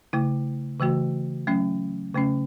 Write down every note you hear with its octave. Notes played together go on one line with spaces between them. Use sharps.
C#3 A3 E4
C#3 E3 A3 F#4
F#3 A3 C#4
C#3 A3 C#4